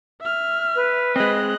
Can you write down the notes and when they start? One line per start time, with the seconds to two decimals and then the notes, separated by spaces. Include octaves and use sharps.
0.21 E5 F6
0.75 B4
1.16 G#3 C4 D#5 F#6